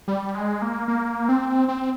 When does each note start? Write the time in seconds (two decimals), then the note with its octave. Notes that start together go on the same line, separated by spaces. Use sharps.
0.08 G3
0.35 G#3
0.62 A#3
0.88 A#3
1.29 C4
1.68 C4